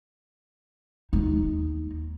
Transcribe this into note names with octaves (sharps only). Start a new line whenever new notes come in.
D#2 D#4